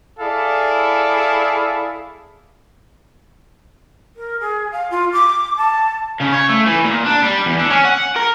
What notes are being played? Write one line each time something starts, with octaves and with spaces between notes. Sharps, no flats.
E4 G#4 A4 D5 F5
A#4
G#4
F5
F4
D6
A5
C#3
C#5
A3
E3
A#2
D4
G3
E2
D3
C#4
F#5
A#4